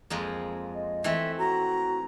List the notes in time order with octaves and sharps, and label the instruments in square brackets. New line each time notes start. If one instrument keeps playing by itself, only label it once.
[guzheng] F2 G#3 A#3
[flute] D#5
[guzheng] E3 A3 C4 [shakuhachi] E5
[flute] F#4 [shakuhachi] A#5